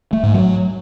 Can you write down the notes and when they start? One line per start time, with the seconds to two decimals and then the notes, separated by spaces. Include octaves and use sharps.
0.13 A3
0.23 G#2
0.34 F#3